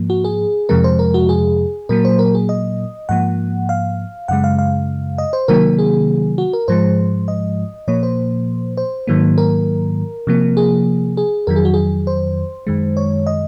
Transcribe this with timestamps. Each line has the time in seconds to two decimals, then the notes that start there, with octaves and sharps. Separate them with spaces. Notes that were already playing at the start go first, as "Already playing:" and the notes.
Already playing: G#2 F3 A#3
0.10 F#4
0.24 G#4
0.69 F2 C3 F3 G#3 A#4
0.84 C5
0.99 A#4
1.14 F#4
1.29 G#4
1.89 A#2 F#3 A#3 A#4
2.05 C5
2.19 A#4
2.35 G#4
2.49 D#5
3.09 G#2 F3 A#3 F#5
3.69 F5
4.28 F#2 C#3 G#3 F#5
4.44 F5
4.59 F5
5.18 D#5
5.33 C5
5.48 C3 D#3 F#3 A#3 A#4
5.79 G#4
6.38 F#4
6.53 A#4
6.68 G#2 F3 G#3 C5
7.28 D#5
7.88 A#2 F3 A#3 C#5
8.03 C5
8.77 C5
9.07 G#2 D#3 F#3 A#3
9.38 A#4
10.27 C3 F3 A#3
10.57 G#4
11.17 G#4
11.47 F2 D#3 F#3 A#4
11.56 G#4
11.65 F#4
11.74 G#4
12.07 C5
12.67 F#2 D#3 G#3
12.97 C#5
13.27 D#5